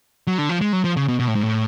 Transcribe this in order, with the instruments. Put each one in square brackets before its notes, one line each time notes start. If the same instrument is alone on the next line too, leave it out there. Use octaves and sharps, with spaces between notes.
[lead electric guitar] F#3
D3
F3
G#3
F#3
F3
C#3
B2
B2
A2
G#2
A2